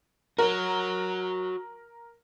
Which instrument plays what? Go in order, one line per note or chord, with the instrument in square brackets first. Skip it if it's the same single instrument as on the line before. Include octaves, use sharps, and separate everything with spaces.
[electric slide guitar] F#4 C#5 [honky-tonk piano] A#4